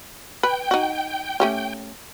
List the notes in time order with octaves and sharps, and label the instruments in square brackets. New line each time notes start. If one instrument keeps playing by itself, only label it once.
[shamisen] B4 [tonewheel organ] G5
[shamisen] D#4 F#4
A3 C#4 G4